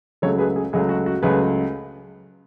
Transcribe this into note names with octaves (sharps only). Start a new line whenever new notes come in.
C#2 C#3 F#3 A3 A4 C#5
G#4 B4
G#4
C#2 C#3 F#3 A3 G#4
F#4
F#4
C#2 C#3 F#3 A3 G#4 B4